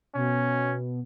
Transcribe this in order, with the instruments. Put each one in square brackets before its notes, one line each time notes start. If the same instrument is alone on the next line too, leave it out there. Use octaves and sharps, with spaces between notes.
[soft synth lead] B2 [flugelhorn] C#4